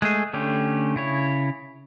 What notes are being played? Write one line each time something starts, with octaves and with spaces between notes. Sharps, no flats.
G#3 A3 G#4
D3 A3 C#4 G4
C#3 E4 C#5